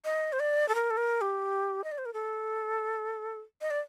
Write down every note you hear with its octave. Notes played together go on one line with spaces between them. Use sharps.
D#5
C5
D5
A4
A#4
A4
A#4
G4
D#5
D5
C5
A#4
A4
D#5
D5